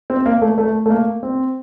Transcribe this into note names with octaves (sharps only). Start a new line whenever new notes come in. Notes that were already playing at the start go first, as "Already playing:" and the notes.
C4
A#3
A3
A3
A3
A#3
C4